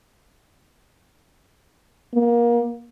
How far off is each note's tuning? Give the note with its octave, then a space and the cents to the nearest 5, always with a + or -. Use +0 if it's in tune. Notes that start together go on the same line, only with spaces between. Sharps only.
A#3 +25